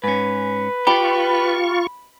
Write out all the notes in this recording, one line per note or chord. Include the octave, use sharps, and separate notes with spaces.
G#2 C#4 B4
F4 G4 B5 C#6